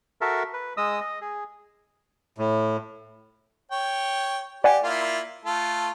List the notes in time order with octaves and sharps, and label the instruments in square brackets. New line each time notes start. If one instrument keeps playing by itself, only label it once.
[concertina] F#4 A4 A#4 E5
B4
G#3 D#5 D#6 E6
D#5
G#4
[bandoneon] A2
[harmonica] C#5 G5
[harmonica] G4 [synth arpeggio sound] D5 F#5 G#5
[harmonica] A#3 E4 F4
A3 F4 A4